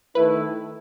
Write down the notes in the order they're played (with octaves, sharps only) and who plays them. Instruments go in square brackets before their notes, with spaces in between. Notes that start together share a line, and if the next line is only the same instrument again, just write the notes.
[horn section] D#3 A3 E4 [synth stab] B4